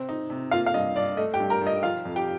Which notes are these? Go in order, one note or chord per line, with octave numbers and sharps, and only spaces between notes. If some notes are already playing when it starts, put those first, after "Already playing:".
Already playing: C3 C4
D#4
C3
A#3 F4 F5
F5
G2 D#5
G2 D5
A3 D#5
G4 G5
G2
A#4 A#5
G2
D#5
F3 F4 F5
F2
G4 G5